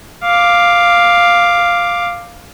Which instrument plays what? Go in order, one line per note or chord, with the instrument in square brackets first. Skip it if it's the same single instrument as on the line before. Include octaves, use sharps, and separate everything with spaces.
[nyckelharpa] F5 D6